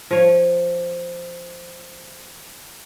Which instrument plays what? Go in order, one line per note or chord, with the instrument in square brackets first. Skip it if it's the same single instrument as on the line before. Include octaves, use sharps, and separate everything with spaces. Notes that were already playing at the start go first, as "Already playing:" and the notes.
[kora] F3 C#5